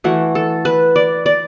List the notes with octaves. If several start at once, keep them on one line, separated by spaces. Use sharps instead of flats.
E3 A3 F#4
A4
B4
D5
D5